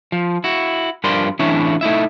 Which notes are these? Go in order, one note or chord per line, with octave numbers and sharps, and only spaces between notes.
F3
E4 F#4
G2 F3 A#4 D5 B5 C6
A2 E3 C#4 D4 E4 C#5
A3 D#4 E4 E5